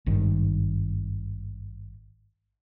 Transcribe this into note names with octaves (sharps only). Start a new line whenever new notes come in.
G#1 G2 D#3